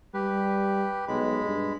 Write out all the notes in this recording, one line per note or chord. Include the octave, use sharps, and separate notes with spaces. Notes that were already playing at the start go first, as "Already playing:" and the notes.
G3 G4 B4
B1 G#3 B5
G2